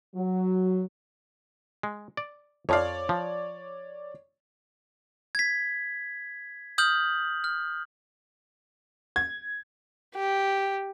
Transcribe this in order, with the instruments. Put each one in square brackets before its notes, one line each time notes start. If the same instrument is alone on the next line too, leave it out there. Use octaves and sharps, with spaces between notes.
[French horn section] F#3
[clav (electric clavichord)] G#3
D5
[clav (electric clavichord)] F2 F3 F5 [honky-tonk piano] C#5 D5
[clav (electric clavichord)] F3
[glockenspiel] G#6 B6
D#6 F6 G6 F#7
F6
[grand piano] G#6
[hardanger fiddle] G4